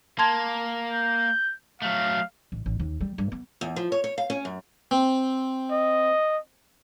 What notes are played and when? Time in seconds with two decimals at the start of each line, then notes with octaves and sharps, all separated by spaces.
0.19 A#3 A5 C6 G#6
0.92 G6
1.82 F#3 A3 F5
2.52 A1
2.66 A1
2.80 D#2
3.01 G3
3.18 G2
3.32 B3
3.61 E2
3.76 F3
3.92 C#5
4.04 C#5
4.18 F5
4.30 C#4
4.45 F#2
4.91 C4
5.71 D#5